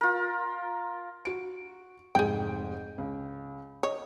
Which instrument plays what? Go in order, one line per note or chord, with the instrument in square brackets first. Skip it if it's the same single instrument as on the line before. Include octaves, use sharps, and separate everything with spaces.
[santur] F4 A#4
[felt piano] F#4 D7
[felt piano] F1 G#2 G6 [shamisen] G#4 G5
[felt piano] C#2
[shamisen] C#5 [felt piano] D#5